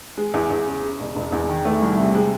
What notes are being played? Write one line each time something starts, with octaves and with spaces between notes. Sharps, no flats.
G#3
E2
E2
C#3
C#3
E1
E1
E2
D#3
A3
C2
C3
G#3